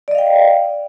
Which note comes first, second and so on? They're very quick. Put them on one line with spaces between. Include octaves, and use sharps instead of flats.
D5 D#5 F5 G5